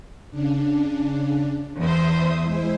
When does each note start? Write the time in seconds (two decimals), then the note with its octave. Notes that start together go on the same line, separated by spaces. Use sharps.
0.30 C#3 D4
1.78 E2 C5 E5 D#6
2.43 G#3 E4 C5